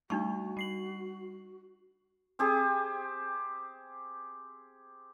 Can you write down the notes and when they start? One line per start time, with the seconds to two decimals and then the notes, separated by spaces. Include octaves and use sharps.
0.10 G3 A3 D4 D#4 F#4 C#6
0.57 G3 C7 F#7
2.39 C4 G4 G#4